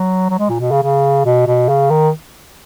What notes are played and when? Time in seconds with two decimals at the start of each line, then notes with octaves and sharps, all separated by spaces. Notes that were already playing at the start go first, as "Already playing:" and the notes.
Already playing: F#3
0.30 F#3
0.39 G#3
0.49 A#2
0.60 B2
0.71 C#3
0.83 C#3
1.25 B2
1.47 B2
1.69 C#3
1.90 D#3